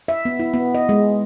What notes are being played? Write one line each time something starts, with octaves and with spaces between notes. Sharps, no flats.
E5
B3
E4
B3
D#5
G#3